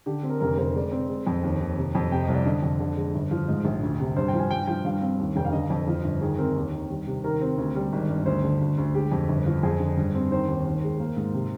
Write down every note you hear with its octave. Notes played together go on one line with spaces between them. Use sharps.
D3 G4
C4
A#4
F1 A#4
F1 C5
G#3 D5
C4
G#3
F2
D#2
D#2
C3
F2
C3 G5
D#5
C2
D5
D3 D#5
F2
D3
G#3
G1
F3
G#2 D#5
A#1
D2
C3
G2 C5
G5
F3
G#5
G2 G5
F3 G5
G2 F5
C4
D#2
F1 G5
F5
D3 D#5
F2
F3
G1
D#3 G#4
C4 A#4
D#2
D#3
G3
C3
D#3 A#4
C4
D2
G3
G#1
G2
D2 C5
D3
D2
D2
G#3 G4
F2
G1
F3
F2 G#4
D3
G2
C4
D#3 C5
D#2
D#2
G#3
A#3
G#2
C3